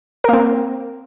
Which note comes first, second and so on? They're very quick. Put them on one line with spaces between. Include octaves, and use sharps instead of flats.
A#4 A#3 C4